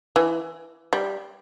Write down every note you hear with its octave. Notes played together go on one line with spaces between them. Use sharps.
E3
G3